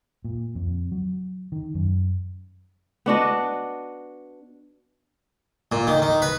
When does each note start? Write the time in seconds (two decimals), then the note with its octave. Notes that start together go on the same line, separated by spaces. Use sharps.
0.24 A#2
0.55 F2
0.92 F#3
1.52 D#3
1.75 F#2
3.06 B3 D4 F#4 D#5
5.72 A#2
5.87 D#3
6.02 D#3
6.22 B4